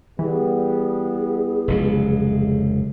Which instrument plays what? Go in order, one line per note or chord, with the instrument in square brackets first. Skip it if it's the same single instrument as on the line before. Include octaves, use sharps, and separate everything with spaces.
[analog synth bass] E3 [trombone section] G3 B3 [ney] G#4
[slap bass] F1 C#2 F#3